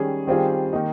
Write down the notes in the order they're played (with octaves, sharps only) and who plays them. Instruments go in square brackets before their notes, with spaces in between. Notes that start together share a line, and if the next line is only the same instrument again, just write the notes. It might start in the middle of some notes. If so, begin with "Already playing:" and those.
Already playing: [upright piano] D#3 G3 C#4 G#4
D#3 G3 C4 F4 G#4
D#3 A#3 D#4